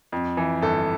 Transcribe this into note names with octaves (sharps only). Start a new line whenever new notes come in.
F2
E3
G1 A4